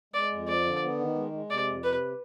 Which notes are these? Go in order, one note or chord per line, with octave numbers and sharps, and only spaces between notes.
G#3 D5
F2
F3 D5
D3
B3
D#3
G#3
G#3
C3 D5
F2
C3 B4